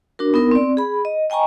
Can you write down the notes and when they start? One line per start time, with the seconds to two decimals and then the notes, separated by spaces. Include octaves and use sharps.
0.19 D4 F#4 A#4
0.34 B3 D#4 A#4
0.51 C4 D5
0.77 G#4 B5
1.05 D#5
1.30 D#5 G5 G#5 A#5 C#6